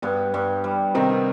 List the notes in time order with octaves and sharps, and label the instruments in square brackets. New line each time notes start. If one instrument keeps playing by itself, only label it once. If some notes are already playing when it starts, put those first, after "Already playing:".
[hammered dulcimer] G2 [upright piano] B3
[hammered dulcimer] G2
G3
[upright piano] C3 C4 [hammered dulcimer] D#3